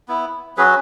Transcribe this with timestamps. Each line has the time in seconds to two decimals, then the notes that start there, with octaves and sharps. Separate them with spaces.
0.08 B3 E4
0.57 F#3 C#4 F#4 G#4 B4